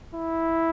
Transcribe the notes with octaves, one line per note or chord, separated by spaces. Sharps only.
E4